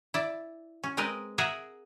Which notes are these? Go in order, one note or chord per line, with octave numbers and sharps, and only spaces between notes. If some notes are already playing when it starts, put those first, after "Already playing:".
E4 D5
C#4
G#3 C4 A#4 B4 D#5
G#4 A#4 E5 F#5 G#5